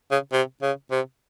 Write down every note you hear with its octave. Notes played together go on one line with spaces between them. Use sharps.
C#3
C3
C#3
C3